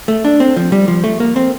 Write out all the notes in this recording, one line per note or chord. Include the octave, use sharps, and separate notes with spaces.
A3
D4
C4
F3
G3
F3
A3
A#3
C4